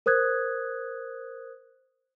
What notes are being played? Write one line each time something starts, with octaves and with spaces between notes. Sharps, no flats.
A#4 C5 D#6 F#6 G#6